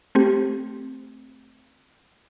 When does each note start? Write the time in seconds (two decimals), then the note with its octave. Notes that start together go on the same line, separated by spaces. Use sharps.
0.15 A3 C4 G4